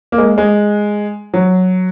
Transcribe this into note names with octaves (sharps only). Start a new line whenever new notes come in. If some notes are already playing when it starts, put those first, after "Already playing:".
A#3
G#3
G#3
F#3